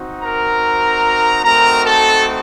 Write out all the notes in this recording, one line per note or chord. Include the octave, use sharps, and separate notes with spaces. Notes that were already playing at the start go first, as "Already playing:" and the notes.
Already playing: C4 D#4 F#4
A#4 A#5
A3 C4 D#4 F#4 A#4 A#5
A4 A5